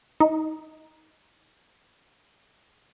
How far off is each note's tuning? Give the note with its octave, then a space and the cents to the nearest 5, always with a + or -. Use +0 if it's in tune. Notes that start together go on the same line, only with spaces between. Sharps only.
D#4 +25